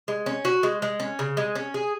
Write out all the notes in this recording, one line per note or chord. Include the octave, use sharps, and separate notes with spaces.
G#3
C#4
F#4
G#3
G#3
C#4
C#3
G#3
C#4
G#4